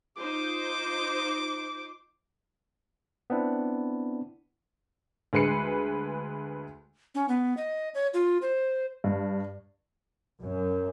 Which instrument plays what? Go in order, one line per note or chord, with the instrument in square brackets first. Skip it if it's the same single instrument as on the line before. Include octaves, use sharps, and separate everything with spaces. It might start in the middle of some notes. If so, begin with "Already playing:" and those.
[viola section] D#4 F4 C5 [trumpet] D6
[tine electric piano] B3 C4 D4 E4
[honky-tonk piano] D2 G#3 B4 C7 C#7
[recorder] C#4
B3
D#5
C#5
F4
C5
[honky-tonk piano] G2
[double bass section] F#2